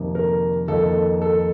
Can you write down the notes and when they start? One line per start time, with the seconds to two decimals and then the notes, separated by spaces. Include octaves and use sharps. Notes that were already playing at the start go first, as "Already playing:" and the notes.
Already playing: F2 C3 D#3 A#3
0.15 A#4
0.68 F2 D#3 A#3 D#4 A4
1.22 A4